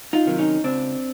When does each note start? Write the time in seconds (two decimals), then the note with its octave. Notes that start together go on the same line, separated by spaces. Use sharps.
0.13 D#4 F4
0.26 C3 D#3 F#3
0.38 C#4 D#4
0.64 C#2 C4 D4